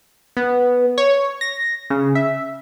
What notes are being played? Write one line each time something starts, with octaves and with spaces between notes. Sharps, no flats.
B3
C#5
A#6
C#3
E5